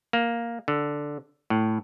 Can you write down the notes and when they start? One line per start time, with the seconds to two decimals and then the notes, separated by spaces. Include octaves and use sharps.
0.13 A#3
0.68 D3
1.50 A2